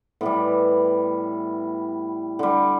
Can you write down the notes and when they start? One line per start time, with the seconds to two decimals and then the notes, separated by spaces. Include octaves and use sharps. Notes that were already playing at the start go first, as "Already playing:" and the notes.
0.21 A2 E3 G3 B3
2.39 D3 G3